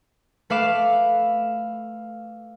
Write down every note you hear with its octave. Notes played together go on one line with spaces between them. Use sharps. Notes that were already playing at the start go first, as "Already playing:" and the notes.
A3 B4 F5 D6 E7